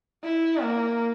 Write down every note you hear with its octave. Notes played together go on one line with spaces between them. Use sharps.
E4
A#3